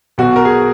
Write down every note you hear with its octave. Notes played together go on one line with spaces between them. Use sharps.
B1 B2 F#4
A#4
G#4